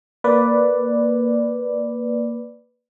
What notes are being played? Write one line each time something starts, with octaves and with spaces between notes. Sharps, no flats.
A#3 B4 D5